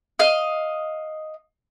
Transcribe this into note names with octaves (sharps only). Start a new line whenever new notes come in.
D#5 F5